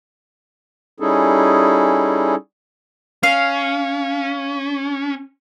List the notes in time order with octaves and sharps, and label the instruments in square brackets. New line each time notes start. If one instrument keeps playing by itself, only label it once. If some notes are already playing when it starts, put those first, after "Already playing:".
[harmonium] G3 C#4 D#4 E4 G#4 A4
[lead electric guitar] C#4 [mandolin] F5